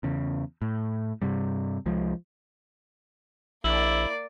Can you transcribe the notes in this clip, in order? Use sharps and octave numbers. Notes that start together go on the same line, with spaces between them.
E2 C#3
A2
G2 C3 G3
C2 F3 G#3
A#1 A#3 E4 D5